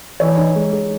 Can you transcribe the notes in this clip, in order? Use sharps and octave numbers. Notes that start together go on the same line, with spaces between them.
E3 C#5
D#4
G#3
G#4